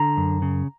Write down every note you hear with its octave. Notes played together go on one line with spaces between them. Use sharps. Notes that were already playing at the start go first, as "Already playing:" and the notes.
Already playing: D3 A#5
F#2
C#3